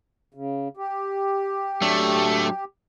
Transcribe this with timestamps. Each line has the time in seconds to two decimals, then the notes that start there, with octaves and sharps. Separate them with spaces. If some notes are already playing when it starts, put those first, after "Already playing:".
0.34 C#3
0.77 G4
1.82 F#3 A3 D4